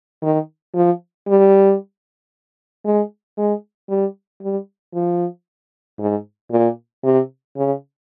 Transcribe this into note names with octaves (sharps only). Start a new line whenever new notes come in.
D#3
F3
G3
G#3
G#3
G3
G3
F3
G#2
A#2
C3
C#3